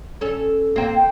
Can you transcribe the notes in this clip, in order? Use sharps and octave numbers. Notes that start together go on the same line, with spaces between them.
C#4 A4
A#3 C4
G5